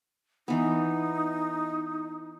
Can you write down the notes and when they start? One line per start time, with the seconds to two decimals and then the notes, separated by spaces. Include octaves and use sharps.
0.48 E3 B3 D#4